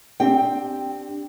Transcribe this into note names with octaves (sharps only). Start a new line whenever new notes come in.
C4 D4 G4 G5